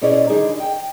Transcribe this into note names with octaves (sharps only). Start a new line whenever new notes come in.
B2 C#4 E4 G#4 D5 D#5
D3 D#3 G3 D4 D#4 G#4
G5